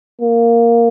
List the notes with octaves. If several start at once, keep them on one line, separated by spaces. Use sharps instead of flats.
A#3